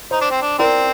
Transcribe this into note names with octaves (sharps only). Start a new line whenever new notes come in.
D#4 C5
D4
C4
D4
C4 A#4 D5